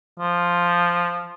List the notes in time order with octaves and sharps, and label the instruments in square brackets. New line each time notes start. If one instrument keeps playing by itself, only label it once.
[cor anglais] F3